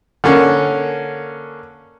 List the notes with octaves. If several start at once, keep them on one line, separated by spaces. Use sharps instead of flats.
D3 A#3 C#4